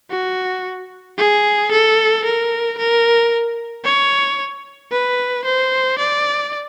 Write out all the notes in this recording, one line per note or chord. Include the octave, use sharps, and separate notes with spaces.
F#4
G#4
A4
A#4
A#4
C#5
B4
C5
D5